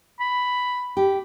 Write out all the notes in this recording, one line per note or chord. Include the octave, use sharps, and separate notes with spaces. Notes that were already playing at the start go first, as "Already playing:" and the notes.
B5
G4